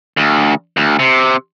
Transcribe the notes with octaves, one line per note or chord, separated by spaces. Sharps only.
D2
D2
C3